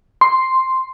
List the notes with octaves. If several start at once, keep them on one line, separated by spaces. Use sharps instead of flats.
C6